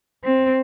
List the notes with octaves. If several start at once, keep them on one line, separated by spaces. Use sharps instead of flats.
C4